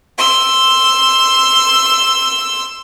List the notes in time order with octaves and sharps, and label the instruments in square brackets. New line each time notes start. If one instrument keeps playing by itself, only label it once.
[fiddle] C6 E6